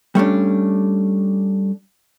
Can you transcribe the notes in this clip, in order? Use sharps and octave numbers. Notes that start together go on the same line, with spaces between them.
G3 A3 C#4 D4